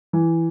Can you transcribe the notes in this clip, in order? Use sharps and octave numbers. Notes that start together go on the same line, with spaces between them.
E3